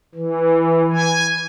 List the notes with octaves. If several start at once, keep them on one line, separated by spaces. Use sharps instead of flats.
E3
G#5